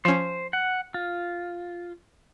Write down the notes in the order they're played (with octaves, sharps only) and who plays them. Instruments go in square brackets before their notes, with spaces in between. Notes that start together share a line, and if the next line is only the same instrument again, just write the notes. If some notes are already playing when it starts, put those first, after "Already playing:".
[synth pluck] F3 C#4 [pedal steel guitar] C5
[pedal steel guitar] F#5
F4